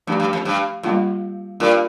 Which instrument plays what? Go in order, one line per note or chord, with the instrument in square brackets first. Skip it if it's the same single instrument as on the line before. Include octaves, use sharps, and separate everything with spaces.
[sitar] G2 [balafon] F3 A3 D4 G4
[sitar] G2
F2
G2
[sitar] G2 [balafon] G3 A#3 F4
[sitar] G2 [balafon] A#3 F4 A#4 D5